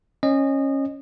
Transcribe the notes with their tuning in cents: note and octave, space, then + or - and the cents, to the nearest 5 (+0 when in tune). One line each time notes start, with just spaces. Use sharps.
C#4 -20 D#5 -25